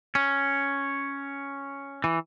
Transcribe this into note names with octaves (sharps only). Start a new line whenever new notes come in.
C#4
E3